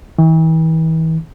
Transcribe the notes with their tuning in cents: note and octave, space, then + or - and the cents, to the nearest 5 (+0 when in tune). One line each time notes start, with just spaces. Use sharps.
E3 -40